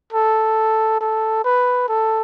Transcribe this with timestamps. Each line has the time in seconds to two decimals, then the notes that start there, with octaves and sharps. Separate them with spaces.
0.13 A4
1.01 A4
1.44 B4
1.88 A4